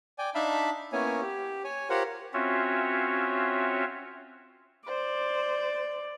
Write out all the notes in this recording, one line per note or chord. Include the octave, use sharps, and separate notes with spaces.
D5 G5 G#5
D4 D#4 E5 F5 A5 B5
A#3 B3 C#4 E4 C#5 G#5
G4
C#5 G#5
F4 G4 A#4 C5 C#5 F#5
C4 C#4 F4 F#4 C#5 E5
C5 D5